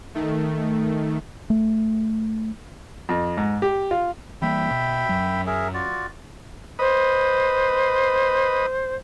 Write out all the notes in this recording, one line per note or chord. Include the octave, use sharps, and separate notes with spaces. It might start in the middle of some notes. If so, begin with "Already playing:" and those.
D#3 A3
A3
F2
G#2
G4
F4
E3 G3 A#3 E5 G5 B5
B2
F#2 F#3
G#4 A#4 E5
F4 F#4 D5
B4 C5 D#5